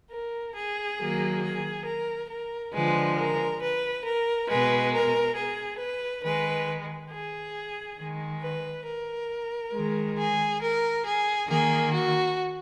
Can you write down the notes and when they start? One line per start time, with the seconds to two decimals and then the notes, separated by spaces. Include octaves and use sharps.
0.11 A#4
0.56 G#4
0.99 D#3 F#3 A#3
1.43 G#4
1.86 A#4
2.30 A#4
2.74 D3 F3 G#3 B4
3.18 A#4
3.62 B4
4.05 A#4
4.48 B2 G#3 B4
4.93 A#4
5.36 G#4
5.79 B4
6.23 D#3 G#3 B4
7.12 G#4
7.99 D#3 G#3
8.42 B4
8.86 A#4
9.74 D#3 G#3
10.17 G#4
10.61 A#4
11.05 G#4
11.48 D#3 A#3 G#4
11.93 F#4